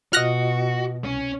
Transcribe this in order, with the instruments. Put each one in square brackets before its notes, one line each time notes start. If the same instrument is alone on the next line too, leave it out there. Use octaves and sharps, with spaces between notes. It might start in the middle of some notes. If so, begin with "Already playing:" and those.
[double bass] B2 [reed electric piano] F4 D#5 [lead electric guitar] F#4 [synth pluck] F6 F#6 A#6
[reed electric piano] C2 [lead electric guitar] C#4